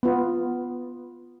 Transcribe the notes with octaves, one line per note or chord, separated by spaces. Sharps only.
B3 F4